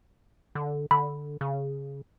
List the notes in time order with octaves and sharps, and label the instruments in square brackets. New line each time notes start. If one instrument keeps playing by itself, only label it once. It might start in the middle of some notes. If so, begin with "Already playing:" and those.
[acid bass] D3
[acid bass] D3 [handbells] B5
[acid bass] C#3